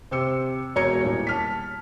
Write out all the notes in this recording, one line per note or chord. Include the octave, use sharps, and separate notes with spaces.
C3 C5 E6 C#7
E1 A#4 C#5 A#5 G#6 C#7
D#1 E4
A5 F6 B6